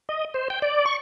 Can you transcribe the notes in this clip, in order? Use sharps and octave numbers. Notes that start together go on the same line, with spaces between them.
D#5
C5
G5
D5
C#6